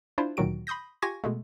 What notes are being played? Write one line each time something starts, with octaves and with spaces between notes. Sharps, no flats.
D4 E4 F4 C5
D2 A#2 D#3 F#3 F#4 D7
B5 C6 D#6 G6 A#6
F4 G4 G#5 C#6 G#6 A#6
B2 G#3 A3